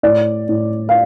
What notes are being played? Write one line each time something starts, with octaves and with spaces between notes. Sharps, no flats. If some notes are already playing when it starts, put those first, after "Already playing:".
A2 D5
A2
F5